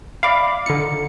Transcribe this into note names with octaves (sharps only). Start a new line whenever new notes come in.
D5 E5 F5 B5 D6
D3 D#4 F4 C#7